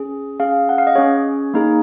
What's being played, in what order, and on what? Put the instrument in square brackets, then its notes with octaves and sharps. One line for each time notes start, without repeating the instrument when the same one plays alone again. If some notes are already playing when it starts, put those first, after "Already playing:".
Already playing: [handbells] C#4 G#4
C#4 G#4 F5
F#5
F5
D#5
C#4 G#4 C#5
A#3 D#4 G#4